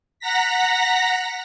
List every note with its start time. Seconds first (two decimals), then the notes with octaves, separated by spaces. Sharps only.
0.19 F#5 A#5 A#6 B6